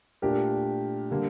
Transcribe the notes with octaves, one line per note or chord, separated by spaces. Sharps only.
A#2 A3 D4 G4 A#4
D3 G3 A#3